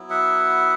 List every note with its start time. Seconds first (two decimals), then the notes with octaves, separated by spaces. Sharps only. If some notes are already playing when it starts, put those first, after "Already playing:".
Already playing: F#3 B3 E4
0.10 E5 F#5